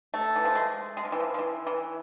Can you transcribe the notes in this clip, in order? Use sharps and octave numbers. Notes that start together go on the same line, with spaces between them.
A3
E3
F3
G#3
G#3
F3
E3
F3
F3
E3
E3